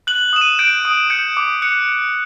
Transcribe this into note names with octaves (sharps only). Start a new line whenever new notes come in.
F#6 F#7
D#6 E7
D#7
G6 D7
D#6
G6 C#7
D6
F#6 C#7